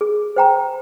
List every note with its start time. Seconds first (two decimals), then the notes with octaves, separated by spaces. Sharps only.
0.01 G#4
0.36 C5 G5 A#5